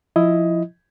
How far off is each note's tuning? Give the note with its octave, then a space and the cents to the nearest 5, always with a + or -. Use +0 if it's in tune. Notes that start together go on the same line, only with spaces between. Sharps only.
F3 +0 E4 +10 D#5 +10